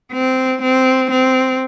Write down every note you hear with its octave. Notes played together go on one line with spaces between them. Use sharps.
C4
C4
C4